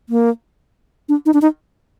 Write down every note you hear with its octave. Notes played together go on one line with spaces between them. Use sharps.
A#3
D4
D#4
D4
D#4